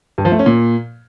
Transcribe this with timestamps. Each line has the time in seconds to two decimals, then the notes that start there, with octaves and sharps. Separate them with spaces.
0.18 G2
0.25 F3
0.32 A3
0.39 C#4
0.46 A#2